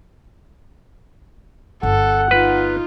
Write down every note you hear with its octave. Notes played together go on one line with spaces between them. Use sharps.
G1 A4 F#5
D#4 F4 B4